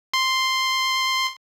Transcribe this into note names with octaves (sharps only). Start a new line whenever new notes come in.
C6